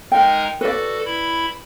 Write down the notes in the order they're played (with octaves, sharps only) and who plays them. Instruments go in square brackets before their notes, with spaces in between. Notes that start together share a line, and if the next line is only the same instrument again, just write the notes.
[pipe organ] G#3 D#4 A#4 [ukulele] G5
[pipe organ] F#4 A4 [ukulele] B4 D5
[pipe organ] E4 B5